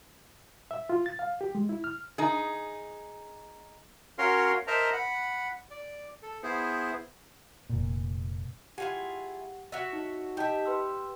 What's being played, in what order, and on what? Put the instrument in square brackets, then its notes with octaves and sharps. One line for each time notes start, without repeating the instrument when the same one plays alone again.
[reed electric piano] E5
F4
A6
F5
G4
G#3
E4
F6
[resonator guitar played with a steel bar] D#4 G#4
[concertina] C#4 F#4 A#4 C#5 F5 C6
A#4 C5 D#5 E5 A5 A#5
F#5 B5
D5
A4
B3 E4 G#4 C5
[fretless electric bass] F1 A#2
[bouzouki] E4 F4 G#4 [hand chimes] G4 F#5
[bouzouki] F#4 C#5 E5
[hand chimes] D#4
[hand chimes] D#4 D#5 A5 [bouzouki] G4 E5
[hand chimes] B4 C6 E6